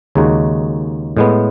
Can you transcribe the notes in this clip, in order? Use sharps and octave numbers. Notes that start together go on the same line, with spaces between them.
D#2 C#3 G#3 D#4 F#4
A2 G#3 B3